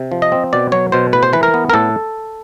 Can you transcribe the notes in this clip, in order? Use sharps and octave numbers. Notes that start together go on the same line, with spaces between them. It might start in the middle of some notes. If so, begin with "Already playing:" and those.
Already playing: C3
F3
D#5
C4
B2 D5
F#3 C#5
B2 C5
A2 B4
C5
E3 B4
A#4
B3
A#4
A2 A4